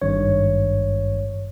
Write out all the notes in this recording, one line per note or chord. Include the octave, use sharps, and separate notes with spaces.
G#1 G2 C#5